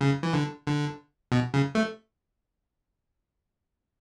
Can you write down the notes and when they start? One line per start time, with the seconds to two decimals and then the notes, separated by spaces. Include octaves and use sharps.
0.01 C#3
0.23 E3
0.33 D3
0.66 D3
1.32 B2
1.54 C#3
1.75 A3